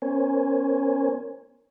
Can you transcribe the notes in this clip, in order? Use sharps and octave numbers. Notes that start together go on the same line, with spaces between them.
B3 C#4 A#4 C5 C#5 G#5